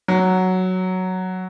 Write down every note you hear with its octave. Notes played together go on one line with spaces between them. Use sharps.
F#3